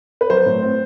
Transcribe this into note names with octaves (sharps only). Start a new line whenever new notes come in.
B4
F#3 C5
A2
C4